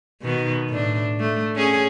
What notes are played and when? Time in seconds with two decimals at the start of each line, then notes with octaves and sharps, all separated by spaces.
0.22 B2 D#3 B3
0.69 A2 D4
1.20 A3
1.56 C#4 G#4